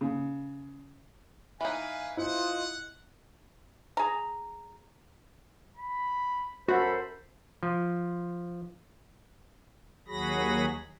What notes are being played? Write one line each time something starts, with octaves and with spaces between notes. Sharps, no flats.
C#3
E3 A#3 D#4 B4 F5 G#5
E4 F4 C5 D#5 F#5
G#4 A#5
B5
F#2 F#4 A4 C5 B5
F3
D#2 F#3 F#4 G#4 B5 A#6